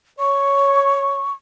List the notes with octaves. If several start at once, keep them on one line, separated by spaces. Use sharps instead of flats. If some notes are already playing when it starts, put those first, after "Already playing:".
C#5 C#6